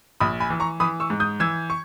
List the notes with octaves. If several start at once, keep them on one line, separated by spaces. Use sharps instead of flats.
A#1 B5 D#6
G#5 B5
E3
A#5 C#6
E3 B5 D#6
C#6 E6
G#2
D#6 G6
E3 E6 G#6
C#6